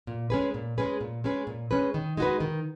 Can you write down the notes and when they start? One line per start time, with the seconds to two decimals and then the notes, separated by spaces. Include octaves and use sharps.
0.07 A#2
0.30 G#3 C#4 G#4 B4
0.54 A#2
0.78 G#3 C#4 G#4 B4
1.01 A#2
1.24 G#3 C#4 G#4 B4
1.47 A#2
1.71 G#3 C#4 G#4 B4
1.94 D#3
2.17 G#3 D#4 F#4 B4
2.40 D#3